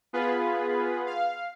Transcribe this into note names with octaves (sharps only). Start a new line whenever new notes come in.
B3 F4 G#4 B4
F5